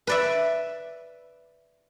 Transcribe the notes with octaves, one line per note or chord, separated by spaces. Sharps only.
B4 D5 E5